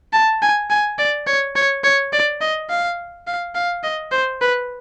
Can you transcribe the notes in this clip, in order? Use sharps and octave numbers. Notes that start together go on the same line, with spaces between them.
A5
G#5
G#5
D5
C#5
C#5
C#5
D5
D#5
F5
F5
F5
D#5
C5
B4